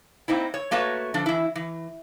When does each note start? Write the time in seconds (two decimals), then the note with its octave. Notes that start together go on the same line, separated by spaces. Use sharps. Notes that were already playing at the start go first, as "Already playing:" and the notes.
0.28 A#3 C4 D#4 E4
0.54 C#5
0.71 A3 A#3 F#4 B4 C#5
1.14 D3 F3 D4
1.26 E3 E4
1.55 E3